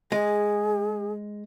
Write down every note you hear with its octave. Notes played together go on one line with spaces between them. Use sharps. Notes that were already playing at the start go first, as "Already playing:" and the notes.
G#3 G#4